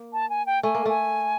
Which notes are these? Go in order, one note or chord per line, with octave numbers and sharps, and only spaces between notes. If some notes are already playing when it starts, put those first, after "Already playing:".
Already playing: A#3
A5
G#5
G5
A3 G#5
A#3
A3 G#5